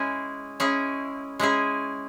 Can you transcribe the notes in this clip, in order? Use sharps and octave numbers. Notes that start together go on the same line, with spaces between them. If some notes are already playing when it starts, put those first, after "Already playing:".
Already playing: G#3 C#4 E4 G#4
G#3 C#4 E4 G#4
G#3 C#4 E4 G#4